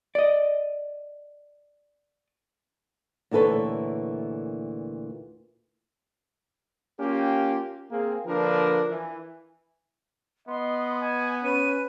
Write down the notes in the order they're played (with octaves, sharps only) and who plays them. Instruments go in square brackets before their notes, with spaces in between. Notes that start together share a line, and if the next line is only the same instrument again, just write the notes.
[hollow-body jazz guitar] D5 D#5
[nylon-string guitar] D2 A#2 E3 A4 B4 C#5
[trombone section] A#3 C#4 F4 G4
A#3 C4 G#4
D3 F3 A#3 D4 A#4 B4
E3
[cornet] B3 [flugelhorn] D#5 [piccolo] C6
[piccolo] G#5
[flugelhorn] C#4 [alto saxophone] B4 [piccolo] D#7